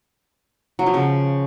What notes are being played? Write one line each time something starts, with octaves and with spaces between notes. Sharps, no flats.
F#3
F3
C#3